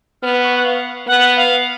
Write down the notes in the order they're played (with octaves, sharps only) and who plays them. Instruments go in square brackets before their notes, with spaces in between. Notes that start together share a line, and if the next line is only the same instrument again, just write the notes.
[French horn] B3 [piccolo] F6
[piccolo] C#6
F#5
F5
[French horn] B3 [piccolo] F#5
[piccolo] F5